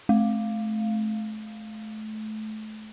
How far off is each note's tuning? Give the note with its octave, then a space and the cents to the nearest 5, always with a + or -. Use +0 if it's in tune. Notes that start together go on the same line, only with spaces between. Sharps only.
A3 -30